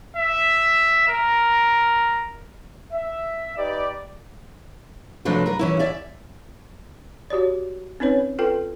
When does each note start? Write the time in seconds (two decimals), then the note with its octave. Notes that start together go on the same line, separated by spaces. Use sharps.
0.16 E5
1.09 A#4
2.92 E5
3.57 D#4 G4 B4 D5
5.25 C3 F3 F#3 A3 D4 B4
5.46 A#4 B4
5.59 E3 C#4 E4
5.79 D5 E5 G#5
7.30 F#4 G4 C#5 D5
8.00 C4 C#4 D#4 B4 C#5
8.39 F4 A4 B4 G5